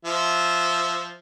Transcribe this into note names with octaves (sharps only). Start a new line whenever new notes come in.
F3 E5